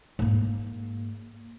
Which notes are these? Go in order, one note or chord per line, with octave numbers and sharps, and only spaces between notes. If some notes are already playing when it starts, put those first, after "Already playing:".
G#2 A#3